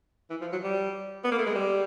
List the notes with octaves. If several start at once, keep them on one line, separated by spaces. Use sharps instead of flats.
E3
F3
F#3
G3
B3
A#3
A3
G#3
G3